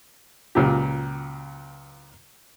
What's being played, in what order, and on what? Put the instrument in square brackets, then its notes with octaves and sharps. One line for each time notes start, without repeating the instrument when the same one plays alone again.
[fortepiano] C#2 A#2 F#3 G4